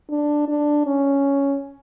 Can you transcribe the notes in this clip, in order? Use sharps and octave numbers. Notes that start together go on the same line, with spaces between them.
D4
D4
C#4